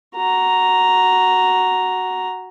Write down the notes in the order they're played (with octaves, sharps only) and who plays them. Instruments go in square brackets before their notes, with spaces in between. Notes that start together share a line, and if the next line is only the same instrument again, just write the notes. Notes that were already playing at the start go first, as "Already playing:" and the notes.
[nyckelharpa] F#4 A#5